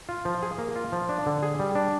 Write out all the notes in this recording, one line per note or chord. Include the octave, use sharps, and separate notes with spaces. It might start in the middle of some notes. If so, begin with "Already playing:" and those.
F4
F3
G#4
A#3
F4
F3
D4
D3
G#4
G3
D4